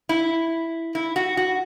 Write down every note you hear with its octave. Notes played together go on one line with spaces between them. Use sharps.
E4
E4
F#4
F#4